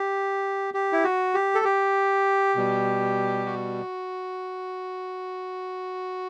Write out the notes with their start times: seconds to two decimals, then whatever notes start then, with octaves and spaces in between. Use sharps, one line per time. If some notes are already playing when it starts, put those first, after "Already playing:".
Already playing: G4
0.74 G4
0.93 E4
1.04 F#4
1.34 G4
1.55 A4
1.65 G4
2.55 B2 G3
3.46 F#4